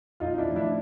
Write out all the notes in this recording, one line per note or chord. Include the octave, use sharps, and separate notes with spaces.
B1 D#4 F4
D#4
D4 E4
A2 F3
D4 E4